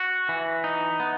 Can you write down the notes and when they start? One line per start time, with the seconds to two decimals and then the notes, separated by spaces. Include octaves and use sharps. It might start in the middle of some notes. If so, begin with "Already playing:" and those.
Already playing: F#4
0.29 E3
0.64 D#4
1.00 B3